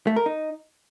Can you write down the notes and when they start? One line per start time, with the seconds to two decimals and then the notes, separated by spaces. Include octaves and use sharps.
0.07 A3
0.16 A#4
0.26 D#4